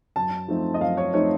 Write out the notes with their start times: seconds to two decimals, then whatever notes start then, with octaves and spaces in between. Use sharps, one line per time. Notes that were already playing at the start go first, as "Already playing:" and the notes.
0.16 F#2 A5
0.48 F3 A3 C4 D#4
0.74 D#5
0.81 F#2 F5
0.97 C#5
1.14 F3 A3 C4 D#4 C#5